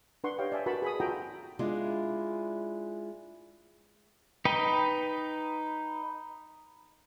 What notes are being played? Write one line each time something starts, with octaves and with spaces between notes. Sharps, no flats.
D4 B4 F#5 C6 C#6
G4 C#5 D#5 F5 G5
D5 E5 G#5 A5
F#4 A#4 B4 A5 B5 C#6
G#4 B5 D#6
F4 F#4 A4 G5 A#5
G#3 D4 E4 F4
D#4 B4 D#5 G5